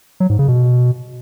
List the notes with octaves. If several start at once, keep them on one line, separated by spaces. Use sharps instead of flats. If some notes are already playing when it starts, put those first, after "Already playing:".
F#3
G#2
C#3
B2